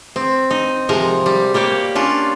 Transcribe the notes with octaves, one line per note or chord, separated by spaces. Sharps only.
C4
D#4
C3 F3 G#3 D#4 A#4
G3
G3 A#3 G4 C#5
C#4 D4 F4